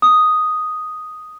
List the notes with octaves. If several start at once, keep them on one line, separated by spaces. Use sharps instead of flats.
D#6